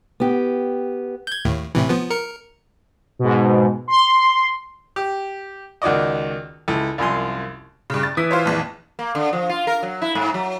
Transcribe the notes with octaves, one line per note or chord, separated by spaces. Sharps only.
B3 G4
G6 G#6
D#2 A2
A2 C3 E3
F3 B3
A#4 C#7
G#2 B2
C6
G4
C#2 D#3 F#4 D5 D#5
C#2 E4 A4
C2 F#2 F3 G#5 C6
G2 C#3
A6
E3 D#6 B6
F4 C5 C#5
A#1 F2
A#3
D3
F3
F4
A#4
F#3
E4
G#2
F#3